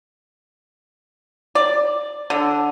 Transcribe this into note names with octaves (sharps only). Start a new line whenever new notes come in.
D5
D3